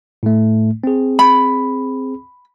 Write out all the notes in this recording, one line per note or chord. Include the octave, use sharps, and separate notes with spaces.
A2 A3
C4 G#4
B5